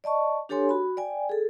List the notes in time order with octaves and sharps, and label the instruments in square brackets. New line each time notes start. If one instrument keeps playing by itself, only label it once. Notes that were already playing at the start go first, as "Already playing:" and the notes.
[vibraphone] D5 D#5 A5 C#6
D4 G4 A4 C#5 G#5 C6
F#4 B5
D5 G5 G#5
G#4 A4